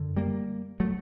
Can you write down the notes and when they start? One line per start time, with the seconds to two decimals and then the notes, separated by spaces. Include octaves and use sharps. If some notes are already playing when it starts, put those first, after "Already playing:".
Already playing: F#2 D3
0.17 G3 A#3
0.80 F#3 A3